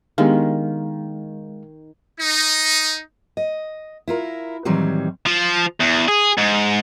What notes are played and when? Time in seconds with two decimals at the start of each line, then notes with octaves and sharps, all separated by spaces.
0.18 D#3 G#3 B3 D4 G4 F5
2.20 D#4
3.37 D#5
4.08 E4 F4 A#4
4.65 A2 D#3 E3 F#3 G3 C4
5.26 F3
5.80 E2
6.08 G#4
6.38 G#2